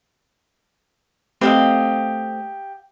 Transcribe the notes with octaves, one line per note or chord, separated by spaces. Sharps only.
A3 C4 G4 B4 D#5 F5